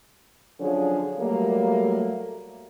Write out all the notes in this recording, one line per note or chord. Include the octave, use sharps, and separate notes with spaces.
D3 F3 F#3 C#4 G#4
F#3 G3 A3 A#3